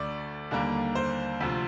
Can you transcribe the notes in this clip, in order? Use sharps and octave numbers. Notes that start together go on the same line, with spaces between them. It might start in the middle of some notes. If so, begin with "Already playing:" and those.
Already playing: D2 D3 A3 D5
D#2 D3 G3 A#3
C5
D2 C3 F3